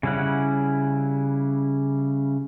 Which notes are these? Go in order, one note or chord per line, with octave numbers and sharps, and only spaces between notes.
C#3 G3 C#4 E4 F#5